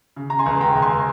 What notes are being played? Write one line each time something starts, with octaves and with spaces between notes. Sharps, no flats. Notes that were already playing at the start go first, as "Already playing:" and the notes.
C#3
A#5
G#5 C6
C#2
G5 A#5
C#2
G#5 C6